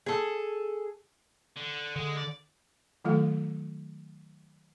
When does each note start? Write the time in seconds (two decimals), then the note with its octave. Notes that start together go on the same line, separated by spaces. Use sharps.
0.06 G#4 A4
1.56 D3
1.96 D3 G#3
2.17 D5
3.05 D#3 F#3 A3 F4 A4 F5